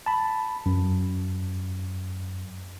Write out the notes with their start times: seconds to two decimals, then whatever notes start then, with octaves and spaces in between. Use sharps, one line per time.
0.06 A5 B5
0.66 F#2